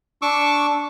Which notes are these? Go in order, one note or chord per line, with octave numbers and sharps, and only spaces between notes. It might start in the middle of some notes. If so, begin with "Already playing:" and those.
D4 C#6 D6 E6